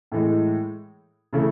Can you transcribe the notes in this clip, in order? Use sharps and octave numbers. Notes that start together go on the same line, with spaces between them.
A2 E3 G#3
C#3 E3 A3 E4